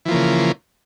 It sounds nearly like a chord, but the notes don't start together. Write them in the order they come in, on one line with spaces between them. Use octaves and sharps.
E3 F3 A#3 C#3